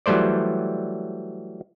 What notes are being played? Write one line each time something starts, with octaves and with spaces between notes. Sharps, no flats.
E3 F#3 G3 A3 C5 D5